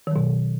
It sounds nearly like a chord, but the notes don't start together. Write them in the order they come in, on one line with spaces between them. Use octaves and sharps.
D#3 F#3 B2